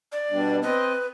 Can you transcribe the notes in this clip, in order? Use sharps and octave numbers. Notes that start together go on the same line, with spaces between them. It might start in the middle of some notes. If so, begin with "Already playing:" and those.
D5
B2 G3 D4
C4 B4 D#5